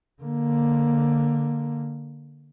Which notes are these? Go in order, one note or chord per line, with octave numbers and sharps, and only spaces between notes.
D3 A#3